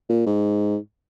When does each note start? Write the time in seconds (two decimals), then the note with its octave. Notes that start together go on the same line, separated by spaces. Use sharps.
0.09 A#2
0.26 G#2